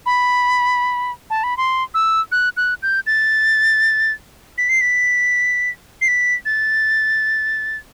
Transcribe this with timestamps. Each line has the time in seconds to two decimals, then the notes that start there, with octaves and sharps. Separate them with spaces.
0.06 B5
1.30 A5
1.44 B5
1.57 C6
1.94 E6
2.32 F#6
2.57 F#6
2.83 G6
3.07 A6
4.58 B6
4.69 C7
4.81 B6
6.02 C7
6.08 B6
6.46 A6